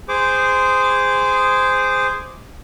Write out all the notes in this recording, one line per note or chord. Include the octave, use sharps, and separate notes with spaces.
G#4 C5 D6